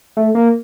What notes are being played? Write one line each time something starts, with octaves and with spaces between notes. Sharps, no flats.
A3
A#3